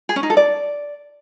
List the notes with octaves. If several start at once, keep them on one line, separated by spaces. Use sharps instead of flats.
G#4
C#4
D#4
A4
D5